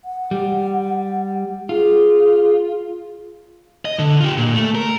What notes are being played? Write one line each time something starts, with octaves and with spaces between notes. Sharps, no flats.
F#5
G3
F4 G#4
D#5
D3
F4 G4
A#2
A3
A#4